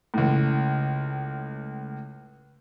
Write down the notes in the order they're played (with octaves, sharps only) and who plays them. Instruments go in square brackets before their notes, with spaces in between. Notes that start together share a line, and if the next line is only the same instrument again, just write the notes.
[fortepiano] C#2 A2